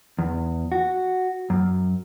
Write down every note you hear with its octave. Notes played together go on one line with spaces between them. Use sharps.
E2
F#4
F#2